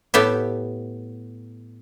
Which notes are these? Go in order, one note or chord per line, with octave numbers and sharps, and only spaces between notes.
A2 B3 G4 E5